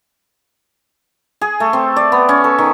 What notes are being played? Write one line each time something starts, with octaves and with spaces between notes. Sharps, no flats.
G#4
A3
C4
D5
B3
C#4
A4
D#3